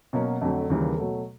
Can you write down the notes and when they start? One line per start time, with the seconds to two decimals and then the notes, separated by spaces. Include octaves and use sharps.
0.13 B2 F#3 A#3 C#4
0.41 F2 D3 F#3 A3
0.70 D#2 C#3 E3 G3 A#3
0.98 B2 F#3 A3